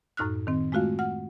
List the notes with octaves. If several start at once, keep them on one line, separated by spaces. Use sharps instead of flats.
F#2 A2 D#4 F6 F#6
D#3 C4
G#3 A3 F4 F#4 F5
F#5 F6